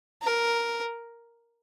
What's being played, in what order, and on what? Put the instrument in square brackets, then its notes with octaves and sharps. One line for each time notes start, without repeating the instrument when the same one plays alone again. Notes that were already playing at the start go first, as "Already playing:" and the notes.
[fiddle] A#4